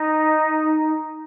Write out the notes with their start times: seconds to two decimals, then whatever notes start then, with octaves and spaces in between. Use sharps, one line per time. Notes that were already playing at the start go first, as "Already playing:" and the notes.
Already playing: D#4